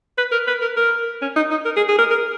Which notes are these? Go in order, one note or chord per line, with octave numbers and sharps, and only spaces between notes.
B4
A#4
B4
A#4
A#4
C#4
D#4
D#4
A#4
G#4
G#4
A#4
A#4